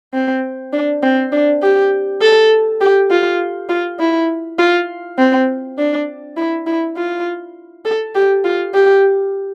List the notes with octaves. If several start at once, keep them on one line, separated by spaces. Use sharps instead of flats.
C4
D4
C4
D4
G4
A4
G4
F4
F4
E4
F4
C4
D4
E4
E4
F4
A4
G4
F4
G4